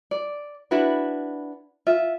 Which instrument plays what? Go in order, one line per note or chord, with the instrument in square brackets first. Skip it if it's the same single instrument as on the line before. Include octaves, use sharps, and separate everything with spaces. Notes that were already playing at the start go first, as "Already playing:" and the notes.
[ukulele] D5
D4 E4 F#4 B4
F4 E5